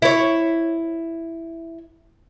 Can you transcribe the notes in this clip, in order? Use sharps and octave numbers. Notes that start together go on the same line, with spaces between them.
E4 C#5